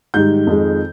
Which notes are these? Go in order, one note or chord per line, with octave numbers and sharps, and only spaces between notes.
G#2 D#3 G3 G6
F2 D#3 G#3